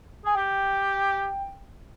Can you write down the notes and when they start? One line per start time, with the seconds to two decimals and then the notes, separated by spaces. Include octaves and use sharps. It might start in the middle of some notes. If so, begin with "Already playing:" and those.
0.25 G#4 G#5
0.35 G4 G5